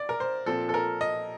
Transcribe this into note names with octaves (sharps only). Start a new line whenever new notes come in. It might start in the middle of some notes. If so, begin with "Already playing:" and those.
Already playing: D5
A#4
C5
A#2 F3 C4 A4
A4
A#4
D#5